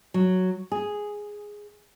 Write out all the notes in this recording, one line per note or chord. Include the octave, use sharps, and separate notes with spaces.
F#3
G#4